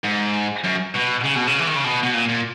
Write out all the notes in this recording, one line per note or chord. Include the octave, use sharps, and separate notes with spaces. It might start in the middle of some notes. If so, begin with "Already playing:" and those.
G#2
F#2
B2
C#3
B2
C#3
E3
D#3
C#3
B2
B2
A#2
A#2